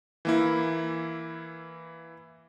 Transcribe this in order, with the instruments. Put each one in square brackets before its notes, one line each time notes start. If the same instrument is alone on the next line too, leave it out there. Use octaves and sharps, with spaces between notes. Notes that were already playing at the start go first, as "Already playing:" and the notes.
[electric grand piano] E3 A#3 E4